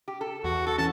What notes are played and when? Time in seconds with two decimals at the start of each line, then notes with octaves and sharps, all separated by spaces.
0.08 G4
0.21 A4
0.44 E2 F#4
0.67 F#4 A4
0.78 E3 C#4 A5